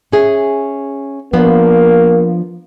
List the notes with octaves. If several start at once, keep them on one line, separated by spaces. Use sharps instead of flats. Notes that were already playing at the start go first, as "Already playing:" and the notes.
C#4 G#4 E5
F3 A#3 B3 D4